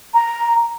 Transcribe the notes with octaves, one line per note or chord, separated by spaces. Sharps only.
A#5